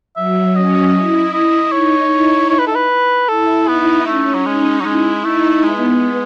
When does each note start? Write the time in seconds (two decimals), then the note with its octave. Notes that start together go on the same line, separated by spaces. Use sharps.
0.16 F#3 E5
0.55 C#4 D#5
0.94 E4
1.33 E4 D#5
1.72 D#4 C#5
2.11 E4
2.50 C#5
2.59 B4
2.67 A4
2.75 B4
3.28 E4 A4
3.68 B3 D#4
4.06 A3 C#4
4.34 F#3
4.46 G#3 D#4
4.81 F#3
4.85 G#3 E4
5.24 A3 D#4
5.63 G#3 B3